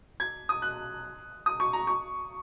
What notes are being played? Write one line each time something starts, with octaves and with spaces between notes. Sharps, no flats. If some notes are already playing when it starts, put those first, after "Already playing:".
G#6
D#6
F#6
D#6
C#6
A#5
C#6